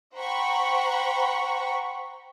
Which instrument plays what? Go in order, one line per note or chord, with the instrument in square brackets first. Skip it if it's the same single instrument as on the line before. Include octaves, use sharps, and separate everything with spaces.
[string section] C5 F#5 G5 A#5 B5 C#6